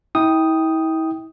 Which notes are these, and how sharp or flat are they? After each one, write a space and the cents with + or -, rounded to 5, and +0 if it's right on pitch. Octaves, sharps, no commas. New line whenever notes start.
E4 -40 G5 +0 D#6 +0